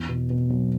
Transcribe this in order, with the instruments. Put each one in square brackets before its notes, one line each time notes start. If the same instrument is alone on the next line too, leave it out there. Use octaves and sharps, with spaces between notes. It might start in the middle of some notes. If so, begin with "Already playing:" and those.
Already playing: [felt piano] E2
B2
B2
F#3